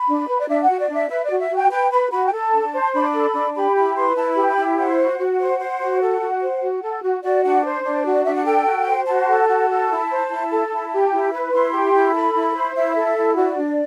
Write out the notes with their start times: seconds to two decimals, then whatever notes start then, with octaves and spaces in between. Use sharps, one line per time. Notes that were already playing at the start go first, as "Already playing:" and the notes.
Already playing: B5
0.08 D4
0.28 B4
0.39 D5
0.48 D4 E5
0.63 F#5
0.69 F#4
0.79 D5
0.89 D4
0.94 E5
1.10 B4 E5
1.25 D5
1.30 F#4
1.40 E5
1.51 F#4
1.56 G5
1.71 B4 G5
1.92 B4 B5
2.12 F#4 B5
2.27 G5
2.32 A4 A5
2.54 D4
2.74 C5
2.82 C6
2.94 D4 B5
3.14 A4
3.34 D4
3.56 G4 B5
3.76 E4 B5
3.96 B4 C6
4.16 E4 A5
4.32 G4 B5
4.48 B5
4.57 E4
4.63 E5
4.78 C5 F#5
4.99 F#4
5.19 F#4
5.40 C5
5.59 C5
5.80 F#4
6.01 A4
6.21 F#4
6.41 C5
6.61 F#4
6.82 A4
7.02 F#4
7.23 F#4 D5
7.43 D4 F#5
7.65 C5
7.84 D4
8.05 F#4
8.13 D5
8.24 D4 E5
8.34 F#5
8.46 A4 G5
8.66 F#4
8.88 C5
9.07 F#4 A5
9.29 A4
9.48 F#4
9.69 A4
9.89 E4
10.10 C5
10.31 E4
10.51 A4
10.71 E4
10.92 G4
11.11 E4
11.33 B4
11.53 E4 C6
11.73 G4
11.94 E4
12.14 A4 B5
12.34 E4
12.55 C5
12.75 E4 E5
12.96 A4
13.17 E4
13.36 F#4 D5
13.57 D4